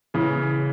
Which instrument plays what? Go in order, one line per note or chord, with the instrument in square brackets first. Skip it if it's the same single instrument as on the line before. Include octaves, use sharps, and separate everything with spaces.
[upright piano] C#3 E3